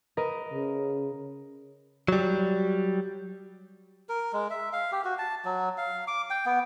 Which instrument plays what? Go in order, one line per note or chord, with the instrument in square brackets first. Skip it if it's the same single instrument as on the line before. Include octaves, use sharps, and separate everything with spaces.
[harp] A#4 B4 D#5
[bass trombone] C#3
[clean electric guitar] F#3 G3
[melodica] A#4
G#3
E5
F5
G4
F#4
A5
F#3
F5
D6
G5
B3